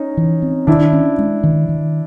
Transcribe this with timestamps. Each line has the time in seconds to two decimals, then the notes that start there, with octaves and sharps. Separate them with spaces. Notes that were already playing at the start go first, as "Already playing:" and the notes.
Already playing: C#4 D#4
0.17 E3
0.42 C4
0.67 D#3 D4 E4
0.93 C#4
1.18 G#3
1.44 D#3
1.69 D#3